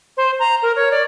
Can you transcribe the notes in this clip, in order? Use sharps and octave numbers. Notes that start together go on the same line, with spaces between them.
C5
A#5
A#4
C#5
D5